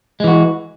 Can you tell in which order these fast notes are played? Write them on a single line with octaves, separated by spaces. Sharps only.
G#3 E3 F#4